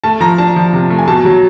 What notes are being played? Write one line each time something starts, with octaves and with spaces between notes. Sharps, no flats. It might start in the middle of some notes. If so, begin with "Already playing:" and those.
A3 A5
F3 A#5
D4 A5
F3
C3
A3
G#5
B2 A5
F#3